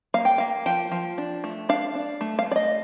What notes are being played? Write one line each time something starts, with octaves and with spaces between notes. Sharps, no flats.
A#3 F5
G5
A#3 F5
F3 G5
F3
D4
A3
D4 F5
D4
A3
F5
A3
D5
D#5